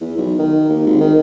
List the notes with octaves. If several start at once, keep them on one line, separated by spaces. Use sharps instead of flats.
E2
B1
D#3
D#2
G#1
D#3